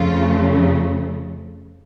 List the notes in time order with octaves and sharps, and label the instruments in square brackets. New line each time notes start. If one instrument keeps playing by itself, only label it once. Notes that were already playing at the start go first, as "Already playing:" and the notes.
Already playing: [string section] F2 C#3 F3 A3 F4